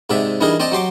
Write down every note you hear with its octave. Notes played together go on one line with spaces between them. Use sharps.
G#2 C3 D5 E5
E3 G3 D4 D#4 G#4 A#4
C4 D5 D#5 G5 A5
F#3 G4 C6 D6